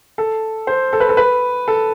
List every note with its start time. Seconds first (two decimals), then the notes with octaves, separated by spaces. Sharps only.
0.18 A4
0.67 C5
0.93 A4
1.00 B4
1.09 A4
1.17 B4
1.68 A4